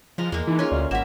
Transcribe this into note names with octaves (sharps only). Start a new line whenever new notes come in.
F3 G#3 A#5
E2 G#3 A#3
E3 D#4 E4
C#4 F4 G#4 G#6
D2 D5 E5
G#1 A#3 E5 F#5 E7